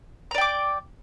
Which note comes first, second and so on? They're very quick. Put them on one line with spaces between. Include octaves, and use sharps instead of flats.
A#5 D5 G5 D6